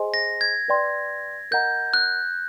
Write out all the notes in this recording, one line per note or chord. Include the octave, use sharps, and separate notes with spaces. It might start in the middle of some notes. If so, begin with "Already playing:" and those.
Already playing: G#4 C5 D#5 G#5 C6
A#6
G#6
B4 D5 G5 C6
A#4 D#5 F#5 A#5 G6
F#6